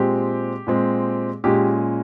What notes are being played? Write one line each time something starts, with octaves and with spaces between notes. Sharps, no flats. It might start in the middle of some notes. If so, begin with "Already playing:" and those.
Already playing: A#2 G#3 C4 G4
A#2 G#3 C4
A#2 G#3 C#4 G4